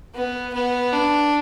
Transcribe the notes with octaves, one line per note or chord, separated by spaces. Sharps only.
B3
B3
D4